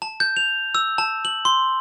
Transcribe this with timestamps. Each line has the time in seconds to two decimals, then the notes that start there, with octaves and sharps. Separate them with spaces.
0.02 A5
0.20 G6
0.37 F7
0.75 E6
0.98 A5
1.25 F#7
1.45 C6